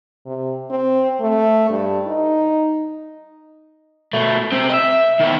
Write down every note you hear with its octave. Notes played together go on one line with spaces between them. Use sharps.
C3
C4
A3
G2
D#4
B2 A3
C3 C4
D#5 E5
D#3 B3